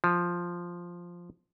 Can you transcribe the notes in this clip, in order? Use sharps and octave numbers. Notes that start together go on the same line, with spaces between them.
F3